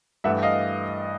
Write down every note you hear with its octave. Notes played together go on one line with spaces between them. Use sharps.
G2 E3 A3 E5 F#5
D#5 F5